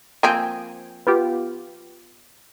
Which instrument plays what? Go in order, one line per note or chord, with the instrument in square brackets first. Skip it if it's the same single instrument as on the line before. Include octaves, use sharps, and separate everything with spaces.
[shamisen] F3 A#3 C4 [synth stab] G5 G#5
[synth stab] B3 F4 G4